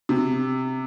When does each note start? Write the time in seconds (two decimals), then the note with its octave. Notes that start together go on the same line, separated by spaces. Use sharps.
0.09 C3